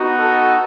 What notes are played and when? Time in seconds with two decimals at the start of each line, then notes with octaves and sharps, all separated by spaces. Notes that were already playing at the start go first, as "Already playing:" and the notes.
Already playing: B3 D#4 F#4
0.19 A4